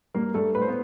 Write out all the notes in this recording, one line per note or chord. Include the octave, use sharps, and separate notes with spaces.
G2 A#3 A#4
G2 A3 A4
A2 B4
C5
B3